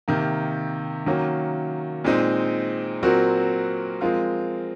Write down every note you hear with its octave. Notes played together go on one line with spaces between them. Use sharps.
C3 D#3 A#3
D#3 F#3 A#3 C#4
A#2 G#3 C4 D#4
A#2 F#3 C4 F#4 A#4
F3 G#3 C4 F4 A#4